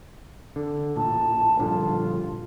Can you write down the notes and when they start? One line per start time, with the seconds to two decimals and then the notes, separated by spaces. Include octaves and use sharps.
0.56 D3
0.96 A1 A#2 A5
1.59 A#1 G2 D3 F4